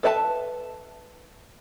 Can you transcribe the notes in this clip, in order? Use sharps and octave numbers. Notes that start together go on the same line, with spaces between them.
A4 B4 E5 F5 A5